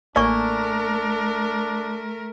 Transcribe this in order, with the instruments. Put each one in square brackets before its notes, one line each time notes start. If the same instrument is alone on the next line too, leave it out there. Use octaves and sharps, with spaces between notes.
[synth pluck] A1 A#3 G#5 [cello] A3 A#4 [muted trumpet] D4 [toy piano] D5 C#6